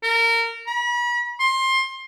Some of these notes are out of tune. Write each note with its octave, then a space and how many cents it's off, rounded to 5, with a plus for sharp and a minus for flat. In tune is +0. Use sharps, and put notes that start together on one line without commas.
A#4 -20
B5 -40
C6 +20